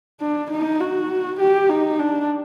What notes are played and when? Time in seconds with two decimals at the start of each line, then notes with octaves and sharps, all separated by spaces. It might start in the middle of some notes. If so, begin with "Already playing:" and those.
0.20 D4
0.51 D#4
0.81 F#4
1.40 G4
1.70 D#4
1.99 D4